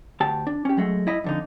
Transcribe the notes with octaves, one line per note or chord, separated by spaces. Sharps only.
D2 G4 A5
D4
C#4 G4
F#3 G#3 A3
E4 D#5 B5
F2 D3 D#4